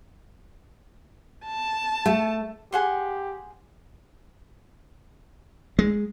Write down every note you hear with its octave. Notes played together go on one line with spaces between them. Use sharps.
A5
A3
G4 G#4 F#5 C6
G#3